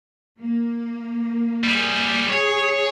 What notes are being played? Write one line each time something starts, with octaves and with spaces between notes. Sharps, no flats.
A#3
G3 G#4
G#4 C#5